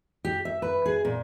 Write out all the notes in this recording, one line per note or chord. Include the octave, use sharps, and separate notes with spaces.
G4
E5
B4
G#4
A#2